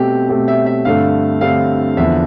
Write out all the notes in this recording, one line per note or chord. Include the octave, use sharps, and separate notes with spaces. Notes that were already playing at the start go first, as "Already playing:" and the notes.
Already playing: B2 A3 C4 G4
B2 A3 C4 G4
E5
E5
G2 D3 A3 C4 F5
G2 D3 A3 C4 F5
E2 D3 F3 E5